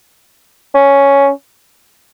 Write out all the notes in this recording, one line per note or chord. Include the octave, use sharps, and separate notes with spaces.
C#4